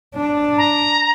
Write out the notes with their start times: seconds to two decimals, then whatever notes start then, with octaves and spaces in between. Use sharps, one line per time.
0.15 D4
0.58 A#5